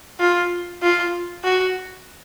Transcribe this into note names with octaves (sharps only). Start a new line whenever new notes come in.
F4
F4
F#4